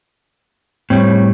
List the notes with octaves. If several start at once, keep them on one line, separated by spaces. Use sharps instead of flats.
A2 G3 C4 C#5